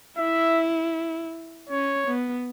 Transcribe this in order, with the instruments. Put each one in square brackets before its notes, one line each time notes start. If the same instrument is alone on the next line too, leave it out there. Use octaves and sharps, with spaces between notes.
[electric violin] E4 [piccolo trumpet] E5
[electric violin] C#4 [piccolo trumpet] C#5
[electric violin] B3